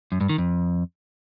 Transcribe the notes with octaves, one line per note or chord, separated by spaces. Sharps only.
F#2
G2
D#3
F2